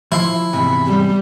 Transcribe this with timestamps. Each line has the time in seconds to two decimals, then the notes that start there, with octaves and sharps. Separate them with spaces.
0.12 F3 E4 C6
0.53 E2 G#2 C3 B5
0.87 G3